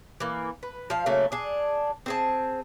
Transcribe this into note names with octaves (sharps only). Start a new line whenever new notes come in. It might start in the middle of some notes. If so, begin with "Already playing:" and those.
E3 A#3
B4
F3 F5
C#3 F#3 A3 A#3
D4 G#4
C4 G#4 A5